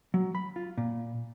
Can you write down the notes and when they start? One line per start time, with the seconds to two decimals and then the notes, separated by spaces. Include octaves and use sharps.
0.14 F#3
0.35 B5
0.56 F4
0.78 A#2